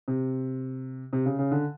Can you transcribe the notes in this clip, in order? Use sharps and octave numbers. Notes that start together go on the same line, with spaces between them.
C3
C3
C#3
C#3
D3